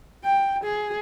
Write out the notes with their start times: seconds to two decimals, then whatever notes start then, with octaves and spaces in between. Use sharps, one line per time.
0.24 G5
0.64 G#4